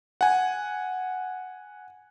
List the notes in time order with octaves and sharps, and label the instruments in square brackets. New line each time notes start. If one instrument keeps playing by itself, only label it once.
[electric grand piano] F#5 G#5